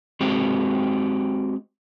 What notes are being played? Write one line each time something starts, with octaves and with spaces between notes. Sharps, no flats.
G#3 C4 F#4 G4